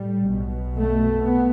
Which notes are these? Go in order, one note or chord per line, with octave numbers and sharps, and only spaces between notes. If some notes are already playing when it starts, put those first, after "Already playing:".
Already playing: A2 G3
B1 B2
A3
B3